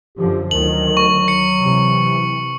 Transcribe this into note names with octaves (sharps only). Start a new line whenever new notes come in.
F#2 D3 F3 G4
D2 D#3 F#3 F#7
C#6
C#7
C3 E3